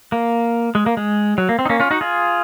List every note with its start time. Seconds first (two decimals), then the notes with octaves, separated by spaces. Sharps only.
0.12 A#3
0.75 G#3
0.86 A#3
0.97 G#3
1.38 F#3
1.49 A#3
1.59 C4
1.65 D#4
1.70 A#3 C#4
1.80 C#4 F4
1.91 D#4 F#4
2.01 F4 G#4